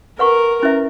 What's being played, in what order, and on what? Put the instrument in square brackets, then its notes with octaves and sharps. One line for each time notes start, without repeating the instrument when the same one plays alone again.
[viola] A#4 [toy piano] B4 F#5 C#6
[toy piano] C#4 E4 B4 E5